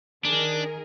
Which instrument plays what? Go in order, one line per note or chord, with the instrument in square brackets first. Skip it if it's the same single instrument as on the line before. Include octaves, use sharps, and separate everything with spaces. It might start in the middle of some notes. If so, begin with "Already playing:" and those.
[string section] D#3 G#4 A#4 [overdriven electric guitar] D4